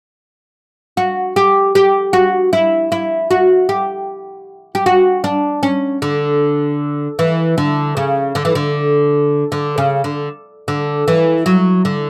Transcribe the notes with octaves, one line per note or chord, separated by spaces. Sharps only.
F#4
G4
G4
F#4
E4
E4
F#4
G4
G4
F#4
D4
C#4
D3
E3
D3
C#3
D3
E3
D3
D3
C#3
D3
D3
E3
F#3
D3